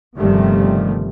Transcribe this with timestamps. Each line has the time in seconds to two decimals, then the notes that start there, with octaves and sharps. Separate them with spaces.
0.18 G1 C3 D#3 F3 G3 A3